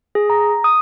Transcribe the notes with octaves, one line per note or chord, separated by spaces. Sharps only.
G#4
A#5
D#6